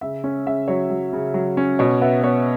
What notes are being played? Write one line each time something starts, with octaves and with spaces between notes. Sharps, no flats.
C#3 E5
C#4
C#3 E5
F#3 C#5
F#3
C#3
F#3
C#4
B2 C#5
B3 E5
B3 C#5